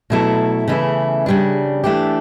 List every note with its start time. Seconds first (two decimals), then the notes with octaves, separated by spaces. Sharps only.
0.10 B2 F#3 A3 E4 A4
0.68 C#3 E3 A3 E4
1.26 C#3 G3 D4
1.84 E3 A3 D4 G4